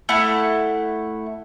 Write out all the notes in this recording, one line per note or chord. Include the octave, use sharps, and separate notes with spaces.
A3 E4 F#5